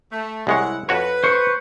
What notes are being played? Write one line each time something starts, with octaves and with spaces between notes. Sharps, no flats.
A3
C2 G#3 E4 C#5 F#5
F2 F#4 B4 C#5
C5 C#6